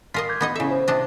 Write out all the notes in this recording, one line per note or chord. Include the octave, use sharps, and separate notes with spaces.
F4 A#4 D#5 B6 C7
D6 G6 G#6
B3 D#4 D#5
C#3 E4 A4 E5
C5
C3 D4 D#5